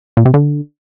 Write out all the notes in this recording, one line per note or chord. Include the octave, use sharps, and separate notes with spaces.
A#2
C3
D3